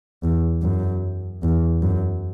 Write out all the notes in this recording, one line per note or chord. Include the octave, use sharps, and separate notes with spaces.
E2
F#2
E2
F#2